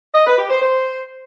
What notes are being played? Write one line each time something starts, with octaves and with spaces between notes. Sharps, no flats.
D#5
B4
G4
C5
C5